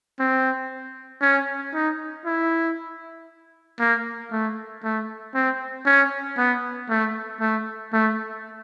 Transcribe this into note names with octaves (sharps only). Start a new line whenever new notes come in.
C4
C#4
D#4
E4
A#3
A3
A3
C4
C#4
B3
A3
A3
A3